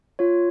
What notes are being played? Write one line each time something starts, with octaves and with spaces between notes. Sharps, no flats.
F4 C#5